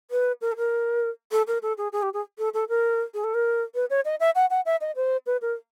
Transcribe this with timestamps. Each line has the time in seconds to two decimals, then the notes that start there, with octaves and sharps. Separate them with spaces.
0.11 B4
0.41 A#4
0.52 A4
0.56 A#4
1.32 A4
1.47 A#4
1.62 A4
1.78 G#4
1.93 G#4
2.02 G4
2.14 G#4
2.38 A4
2.54 A4
2.69 A#4
3.14 G#4
3.24 A4
3.34 A#4
3.75 B4
3.90 C#5
4.05 D#5
4.20 E5
4.35 F#5
4.50 F#5
4.66 E5
4.81 D#5
4.96 C5
5.26 B4
5.42 A#4